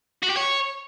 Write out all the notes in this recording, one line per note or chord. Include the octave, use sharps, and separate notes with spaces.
F#4
G4
C#5